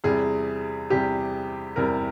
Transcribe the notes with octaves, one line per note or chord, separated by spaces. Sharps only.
E2 C3 G3 G#4
E2 C3 G3 G4
E2 C3 G3 A#4